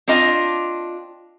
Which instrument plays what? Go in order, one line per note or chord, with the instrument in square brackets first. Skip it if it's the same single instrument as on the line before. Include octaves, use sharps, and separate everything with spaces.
[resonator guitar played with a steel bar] C4 D4 F4 D#5 A5